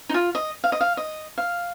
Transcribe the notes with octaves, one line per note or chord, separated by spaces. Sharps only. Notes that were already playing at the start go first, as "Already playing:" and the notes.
D#4
F4
D#5
F5
D#5
F5
D#5
F5